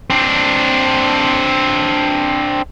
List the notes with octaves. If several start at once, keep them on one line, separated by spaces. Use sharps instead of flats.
C4 D4